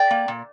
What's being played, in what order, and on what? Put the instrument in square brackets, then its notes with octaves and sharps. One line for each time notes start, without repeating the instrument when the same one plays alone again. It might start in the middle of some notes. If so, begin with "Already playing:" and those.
Already playing: [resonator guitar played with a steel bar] D5 G5
A#3
A#2